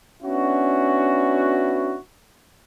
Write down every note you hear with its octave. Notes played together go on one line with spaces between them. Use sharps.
B3 C#4 D4 E4 F#4